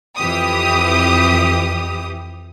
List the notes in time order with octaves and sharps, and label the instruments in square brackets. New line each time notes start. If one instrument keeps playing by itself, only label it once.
[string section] F2 E3 G4 D#6